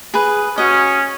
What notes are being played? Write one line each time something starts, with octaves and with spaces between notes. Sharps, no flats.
G#4 B4
C#4 F#4 D#5